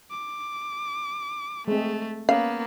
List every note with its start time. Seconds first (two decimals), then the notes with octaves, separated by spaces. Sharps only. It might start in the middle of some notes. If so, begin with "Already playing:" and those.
0.10 D6
1.68 G#3 A3 C4
2.29 A#3 B3 C#4 F5